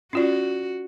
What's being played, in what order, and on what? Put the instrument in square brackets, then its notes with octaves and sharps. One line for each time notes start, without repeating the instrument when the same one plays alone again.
[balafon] C#4 F4 D5 [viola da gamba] F#4